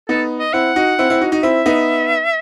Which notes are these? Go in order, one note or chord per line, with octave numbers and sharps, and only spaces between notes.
B3 D#4 A4
D#5
C4 E4 F#5
D#4 F#4
C4 E4
C4 E4
D#4 F#4
D#4 F#4
C4 E4 E5
B3 D#4